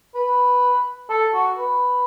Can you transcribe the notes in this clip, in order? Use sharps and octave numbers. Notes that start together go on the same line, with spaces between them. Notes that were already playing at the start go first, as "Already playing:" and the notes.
B4
A4
F#4
B4